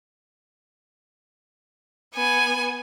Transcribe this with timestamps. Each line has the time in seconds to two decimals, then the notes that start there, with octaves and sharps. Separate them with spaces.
2.14 B3 G#5